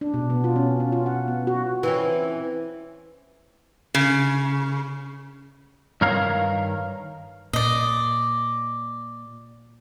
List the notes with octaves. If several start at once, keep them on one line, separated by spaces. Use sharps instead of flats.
D4
B2
B3
F4
C#4
C#4
F4
F#5
B3
F#4
E3 C4 C#4
C#3
G2 D#3 A#4 C#5 F5 A#5
A#2 D5 D#5